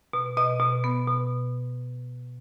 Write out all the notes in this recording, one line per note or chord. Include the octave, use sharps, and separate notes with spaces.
B2
B2 D#5
B2
B3
B2